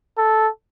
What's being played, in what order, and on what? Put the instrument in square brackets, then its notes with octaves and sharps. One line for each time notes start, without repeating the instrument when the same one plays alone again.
[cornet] A4